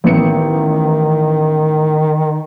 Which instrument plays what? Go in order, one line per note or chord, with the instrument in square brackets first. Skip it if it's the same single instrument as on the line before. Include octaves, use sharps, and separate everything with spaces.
[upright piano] A1 B3 C#7 [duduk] D#3